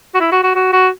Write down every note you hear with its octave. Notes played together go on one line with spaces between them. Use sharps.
F#4
E4
F#4
F#4
F#4
F#4